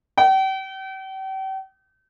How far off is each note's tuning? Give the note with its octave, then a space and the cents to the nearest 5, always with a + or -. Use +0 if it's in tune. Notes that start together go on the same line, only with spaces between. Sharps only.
G5 -40